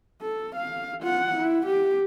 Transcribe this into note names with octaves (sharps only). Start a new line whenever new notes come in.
A4
F5
F4 F#5
E4
G4